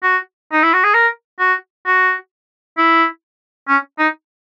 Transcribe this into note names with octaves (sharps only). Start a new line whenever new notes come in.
F#4
D#4
E4
F#4
G#4
A#4
F#4
F#4
E4
C#4
D#4